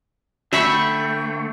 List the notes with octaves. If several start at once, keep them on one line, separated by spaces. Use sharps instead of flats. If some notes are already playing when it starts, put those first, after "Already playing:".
D3 A3 E5 G5 B5 C#6